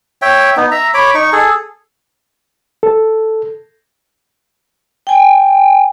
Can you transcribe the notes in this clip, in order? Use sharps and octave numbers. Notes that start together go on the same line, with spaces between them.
C#5 E5 G5
B3 D#4
E5 A#5
C#5 B5 D6
D#4 C#6
G#4 A4
A4
G5 G#5